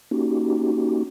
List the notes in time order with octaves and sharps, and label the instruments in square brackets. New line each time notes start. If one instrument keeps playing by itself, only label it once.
[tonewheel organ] A#3 C#4 D#4 F#4 G4